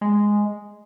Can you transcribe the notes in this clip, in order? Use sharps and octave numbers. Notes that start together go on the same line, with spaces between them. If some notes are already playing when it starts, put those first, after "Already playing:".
G#3